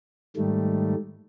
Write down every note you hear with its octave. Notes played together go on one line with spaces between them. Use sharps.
G#2 D#3 G3 A3